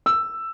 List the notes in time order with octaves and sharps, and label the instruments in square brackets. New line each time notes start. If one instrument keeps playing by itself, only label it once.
[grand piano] E6